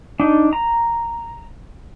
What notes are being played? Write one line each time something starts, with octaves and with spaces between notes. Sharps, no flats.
D4 D#4
A#5